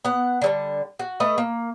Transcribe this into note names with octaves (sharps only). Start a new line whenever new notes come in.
B3 F#5
D3 F#3 G3
F#4
A3 B4 D#5
A#3